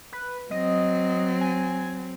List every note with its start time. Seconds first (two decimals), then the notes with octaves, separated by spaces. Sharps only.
0.13 B4
0.51 F#3 C4 D#5
1.41 G#5